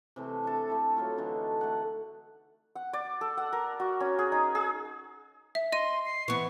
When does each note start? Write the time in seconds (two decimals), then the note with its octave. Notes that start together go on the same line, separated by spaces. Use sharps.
0.16 C3 E3 A3
0.44 D4 G4 A4
0.68 A3 E4 G4
0.97 F#3 A3 F4
1.17 D3 E3 D4 D#4
1.61 A3 F#5
2.75 F#5
2.93 D5
3.21 A4
3.37 F#5
3.53 A#4
3.80 F#4
4.00 C#4
4.19 G#4
4.32 D#4
4.55 G#4
5.55 E5
5.72 D#5 C6 D#7
6.05 C7
6.28 E3 B3 C#6